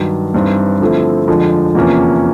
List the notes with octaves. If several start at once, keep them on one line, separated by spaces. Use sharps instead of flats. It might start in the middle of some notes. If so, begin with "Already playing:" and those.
Already playing: G2 D#3 F#3
G2 E3 G3 C4 D#4
D3 F3 A3 C4 E4
F2 D3 F3 G#3
E2 C3 F3 A#3 C#4